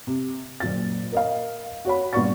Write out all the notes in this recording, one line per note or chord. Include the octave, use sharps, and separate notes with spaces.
C3
F#1 A#2 A6
A#4 D#5 F5
F#4 C#5 B5
G2 A#2 B3 D5 C#6 A6